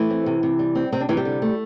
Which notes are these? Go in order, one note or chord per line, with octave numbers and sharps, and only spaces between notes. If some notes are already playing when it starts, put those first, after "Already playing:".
Already playing: E3 A3 E4
C4
C3
C3
G3
C4
C3 C4
D4
C3 E3 E4
G3 G4
D3
A3